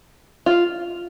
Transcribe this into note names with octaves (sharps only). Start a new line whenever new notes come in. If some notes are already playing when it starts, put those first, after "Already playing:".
F4